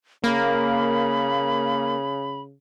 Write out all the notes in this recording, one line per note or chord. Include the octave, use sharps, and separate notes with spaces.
C#3 A#3 B5